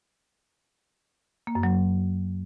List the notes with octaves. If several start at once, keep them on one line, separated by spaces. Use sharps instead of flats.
A#3
F#2
F#3